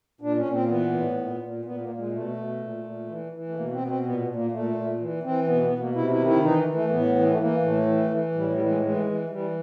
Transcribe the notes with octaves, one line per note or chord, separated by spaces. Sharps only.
A#2 D4
C#4
A#2
C4
A#3
E3 B3
A2
A#2
A#2
A#2 B3
A#3
A#2
G#3
B2 A3
B2
A#2
A#2
E3
E3
A3
B2 A#3
C4
B2 B3
C4
A#2 B3
A#2
A#3
A#2 A3
A#2
E3
E3 C4
B2 B3
B3
B2
A#3
C3 E4
E4
D#3
E4
E3 D#4
E3
A3
A2 B3
E3
A3
E3 A#3
A2 A3
E3
E3
A2 G3
G3
E3
G#3
E3 G#3
E3
E3 G3